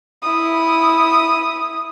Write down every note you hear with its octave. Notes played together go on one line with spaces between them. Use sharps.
E4 D#6